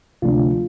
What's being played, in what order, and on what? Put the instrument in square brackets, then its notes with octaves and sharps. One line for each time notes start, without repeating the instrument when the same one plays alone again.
[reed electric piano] D2 C3 F3 A3 D4 F4